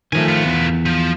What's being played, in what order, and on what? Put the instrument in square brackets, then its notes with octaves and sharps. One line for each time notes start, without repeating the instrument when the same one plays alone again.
[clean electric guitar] D#3 F3 A3 [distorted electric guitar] D#4 G#5
[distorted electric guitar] B3 F4
[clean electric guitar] E2
[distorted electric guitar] F3